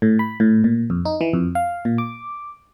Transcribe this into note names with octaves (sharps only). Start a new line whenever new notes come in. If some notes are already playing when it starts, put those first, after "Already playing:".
A2
B5
A2
A#2
F2
D#4
E3
F2
F5
A#2
D6